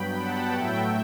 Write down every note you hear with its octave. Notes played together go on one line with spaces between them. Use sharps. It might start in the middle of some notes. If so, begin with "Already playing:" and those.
Already playing: G2 F#3 B3 G5 B5
F#5 A5
A2 F#3 A3 E5 G5